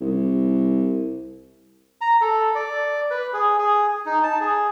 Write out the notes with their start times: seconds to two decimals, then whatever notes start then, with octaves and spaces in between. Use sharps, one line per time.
0.01 C2
2.01 A#5
2.21 A4
2.55 D5
3.11 B4
3.33 G#4
3.58 G#4
4.06 D#4
4.23 A5
4.41 G#4